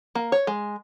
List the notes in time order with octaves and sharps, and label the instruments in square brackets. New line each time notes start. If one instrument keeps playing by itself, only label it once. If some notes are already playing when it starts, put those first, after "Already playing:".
[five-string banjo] A#3
C#5
G#3